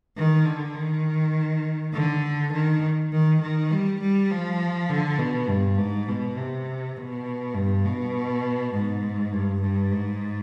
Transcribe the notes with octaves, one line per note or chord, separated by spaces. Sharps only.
D#3
D3
D#3
D3
D#3
D#3
D#3
G3
G3
F3
D3
B2
G2
G#2
B2
C3
B2
G2
B2
G#2
G2
G2
G#2